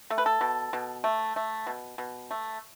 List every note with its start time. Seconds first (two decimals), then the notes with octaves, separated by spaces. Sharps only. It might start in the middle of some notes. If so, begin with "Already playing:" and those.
0.10 A3
0.18 B4
0.26 A4
0.41 B2
0.73 B2
1.04 A3
1.36 A3
1.67 B2
1.98 B2
2.31 A3